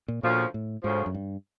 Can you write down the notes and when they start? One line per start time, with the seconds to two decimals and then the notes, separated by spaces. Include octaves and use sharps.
0.08 A#2
0.23 D2 A#2 C#3 F3
0.54 A2
0.84 D2 G#2 C#3 F3
1.06 F#2
1.15 G2